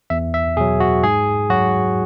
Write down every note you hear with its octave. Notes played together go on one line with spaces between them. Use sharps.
E2 E5
E5
B2 F#3 G#4
F#4
G#2 G#4
F#3 F#4